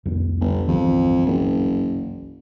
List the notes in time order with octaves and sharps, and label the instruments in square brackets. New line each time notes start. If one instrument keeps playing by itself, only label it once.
[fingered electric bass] C2 F2 D4
[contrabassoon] G1
[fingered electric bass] G1 C2 E3 [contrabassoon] F2
[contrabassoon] F#1